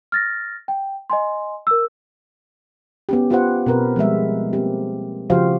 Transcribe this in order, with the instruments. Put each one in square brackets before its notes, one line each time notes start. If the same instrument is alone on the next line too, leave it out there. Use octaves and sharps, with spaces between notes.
[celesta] F6 A6 A#6
G5
D#5 G#5 C6
A#4 E6
[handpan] B3 C#4 G4
B3 F4 G4 B4 C5 F#5
B2 C4 A#4 B4
F3 G3 G#3 E5
A#3 C4 G4
C#3 F3 F#4 G4 C5 F5